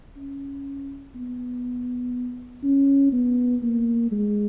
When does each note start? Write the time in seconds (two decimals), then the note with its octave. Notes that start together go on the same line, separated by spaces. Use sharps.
0.17 C#4
1.16 B3
2.64 C#4
3.12 B3
3.63 A#3
4.12 G#3